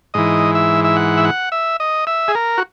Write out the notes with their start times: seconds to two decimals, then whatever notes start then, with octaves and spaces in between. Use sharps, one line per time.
0.14 G#2 E3 D#5
0.55 E5
0.84 E5
0.96 F#5
1.17 E5
1.24 F#5
1.52 E5
1.80 D#5
2.07 E5
2.28 G#4
2.35 A#4
2.58 F#4